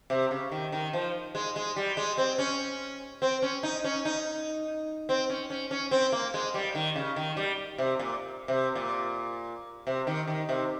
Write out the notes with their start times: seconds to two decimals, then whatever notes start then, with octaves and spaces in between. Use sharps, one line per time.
0.10 C3
0.31 C#3
0.52 D#3
0.72 D#3
0.93 F3
1.35 G#3
1.56 G#3
1.76 G3
1.97 G#3
2.18 C4
2.38 C#4
3.22 C4
3.42 C#4
3.63 D#4
3.84 C#4
4.05 D#4
5.09 C4
5.30 C#4
5.50 C#4
5.71 C#4
5.91 C4
6.12 A#3
6.34 G#3
6.54 G3
6.75 D#3
6.96 C#3
7.16 D#3
7.37 G3
7.78 C3
7.99 A#2
8.48 C3
8.75 A#2
9.87 C3
10.07 D#3
10.28 D#3
10.49 C3